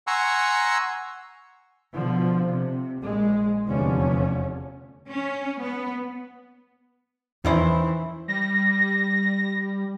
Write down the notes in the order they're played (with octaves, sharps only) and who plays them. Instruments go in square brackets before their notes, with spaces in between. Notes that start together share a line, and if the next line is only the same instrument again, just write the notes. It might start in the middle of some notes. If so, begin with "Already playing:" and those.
[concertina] F#5 G#5 A#5 C6 C#6 E6
[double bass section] B2 D3 F3
C3
A#1 G#3
F1 E2 D3 F3 C#4
[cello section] C#4
B3
[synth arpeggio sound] E2 C#4 [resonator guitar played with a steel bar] D#3 E4 C5 [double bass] E3
[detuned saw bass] G3 [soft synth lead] A#6